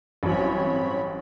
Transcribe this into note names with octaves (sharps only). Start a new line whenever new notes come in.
A1 G2 F#3 C4 C#5 B5